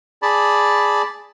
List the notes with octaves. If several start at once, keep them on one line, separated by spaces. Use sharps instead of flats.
G#4 D5 A5 B5